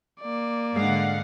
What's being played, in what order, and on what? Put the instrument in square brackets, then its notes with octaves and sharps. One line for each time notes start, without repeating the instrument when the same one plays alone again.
[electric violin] A#3 D5
[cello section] G#2 D3 [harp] G#3 [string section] F5 F#5